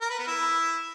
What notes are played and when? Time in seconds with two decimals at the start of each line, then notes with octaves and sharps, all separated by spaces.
0.02 A#4
0.10 B4
0.19 B3
0.27 E4